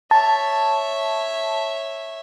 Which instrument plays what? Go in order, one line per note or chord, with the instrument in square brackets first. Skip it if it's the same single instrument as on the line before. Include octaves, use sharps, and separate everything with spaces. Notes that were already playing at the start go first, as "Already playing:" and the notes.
[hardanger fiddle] C#5 E5 [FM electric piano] A5